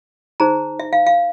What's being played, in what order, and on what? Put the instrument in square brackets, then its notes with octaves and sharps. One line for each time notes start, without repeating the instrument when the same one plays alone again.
[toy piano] D#4 G#4 C5 A#5
E5
F5
F5